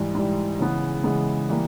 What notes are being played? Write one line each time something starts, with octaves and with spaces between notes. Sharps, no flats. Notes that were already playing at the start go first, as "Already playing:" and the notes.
Already playing: G#2 E3 G3
G#2 E3 G3
C#3 E3 G#3 B3
C#3 E3 G#3 B3
E3 G3 A#3